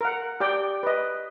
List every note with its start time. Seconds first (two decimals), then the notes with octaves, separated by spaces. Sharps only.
0.01 A#4 F#5
0.40 G4 D5 G5
0.83 B4 D#5